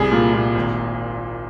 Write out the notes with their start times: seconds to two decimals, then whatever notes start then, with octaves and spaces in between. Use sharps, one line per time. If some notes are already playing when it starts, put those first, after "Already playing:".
Already playing: C2 G3 G#4
0.12 A#2
0.33 A#2
0.55 G#1